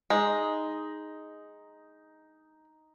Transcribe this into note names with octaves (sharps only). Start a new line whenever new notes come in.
G#3 D#4